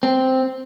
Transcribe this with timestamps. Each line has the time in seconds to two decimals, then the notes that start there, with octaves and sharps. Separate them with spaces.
0.03 C4